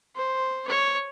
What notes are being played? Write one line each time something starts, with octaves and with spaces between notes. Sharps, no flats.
C5
C#5